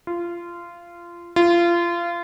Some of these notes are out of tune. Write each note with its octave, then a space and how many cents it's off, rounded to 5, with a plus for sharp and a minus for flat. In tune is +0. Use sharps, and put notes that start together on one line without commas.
F4 -20
F4 -25